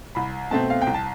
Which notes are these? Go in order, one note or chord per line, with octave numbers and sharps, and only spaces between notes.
C2 B5
B2 A3 C4 A5
F5
G5
C2
A5